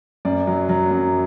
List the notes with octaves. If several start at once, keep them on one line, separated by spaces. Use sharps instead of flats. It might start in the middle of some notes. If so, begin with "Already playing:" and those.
F#2 D5
F#3
F#3
F#2